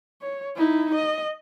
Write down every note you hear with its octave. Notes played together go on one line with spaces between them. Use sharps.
C#5
D#4 E4
D#5